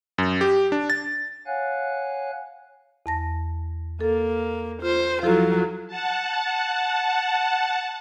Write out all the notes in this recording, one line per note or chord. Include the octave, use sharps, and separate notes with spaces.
F#2
G4
D4
A6
C#5 F5 F#5 G#5 F#6
E2 A5 A#6
A#3 A4
F4 C5
F3 F#3 E4 F4 A4
F#5 A5